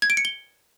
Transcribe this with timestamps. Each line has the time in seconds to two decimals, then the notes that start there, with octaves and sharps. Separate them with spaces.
0.02 G#6
0.10 D7
0.17 C#7
0.25 G7